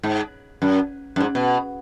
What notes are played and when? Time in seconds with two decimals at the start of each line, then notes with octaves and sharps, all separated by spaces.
0.03 G#2
0.62 F#2
1.16 F#2
1.20 G#2
1.35 B2